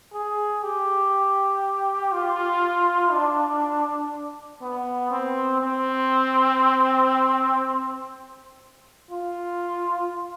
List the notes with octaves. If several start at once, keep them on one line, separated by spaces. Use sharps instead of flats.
G#4
G4
F4
D4
B3
C4
C4
F4